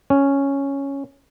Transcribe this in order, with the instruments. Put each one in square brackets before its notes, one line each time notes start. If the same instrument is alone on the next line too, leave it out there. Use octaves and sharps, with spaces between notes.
[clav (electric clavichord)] C#4